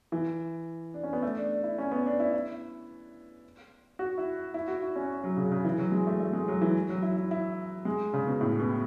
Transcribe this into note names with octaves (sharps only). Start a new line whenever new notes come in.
E3
D4
C#4
B3
A3
D4
E4
C#4
B3
D4
E4
E4
F#4
E4
E4
F#4
E4
C#4
F#3
C#3
C#3
E3
F#3
G#3
A3
A3
G#3
F#3
E3
F#3
E4
E4
E4
G#3
C#3
B2
A2
B2